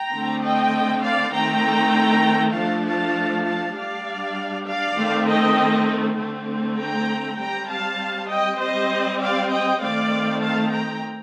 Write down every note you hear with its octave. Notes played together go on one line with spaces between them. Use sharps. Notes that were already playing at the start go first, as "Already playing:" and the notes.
Already playing: G5 A#5
D3 A3 C4
D#5 G5
D5 F5
D#3 A3 C4 G5 A#5
F3 A3 D4 F5 A5
F5 A5
F5 A5
G3 D4 D5 F5
D5 F5
D#3 A3 C4
D#5 G5
D3 A3 C4
G5 A#5
G3 C4 G5 A#5
F5 A5
D#5 G5
G3 C4 C5 D#5
D5 F5
D#5 G5
D#3 A3 C4 D5 F5
F5 A5
G5 A#5